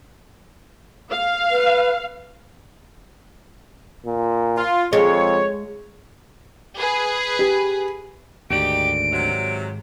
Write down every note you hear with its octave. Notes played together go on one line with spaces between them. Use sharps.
F5
B4
A#2
F4
F2 G#3 C#5
G#4 B4
G4
D2 G#2 D#3 D#4 G4 D5 D7
C3 F#3